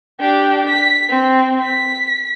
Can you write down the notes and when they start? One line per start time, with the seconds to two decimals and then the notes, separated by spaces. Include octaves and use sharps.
0.20 D4 G4
0.69 B6
1.09 C4
1.63 B6